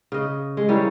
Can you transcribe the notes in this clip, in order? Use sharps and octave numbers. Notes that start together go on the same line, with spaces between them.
C#3 D#5
G#3
E3 G3 A#3 C#4